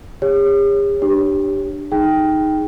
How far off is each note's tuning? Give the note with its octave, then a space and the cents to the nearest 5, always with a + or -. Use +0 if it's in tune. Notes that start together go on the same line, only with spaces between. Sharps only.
G4 +45 C#5 -5
D4 +15 G4 -5 C#5 +5
D#4 +0 G#4 +0 G5 +0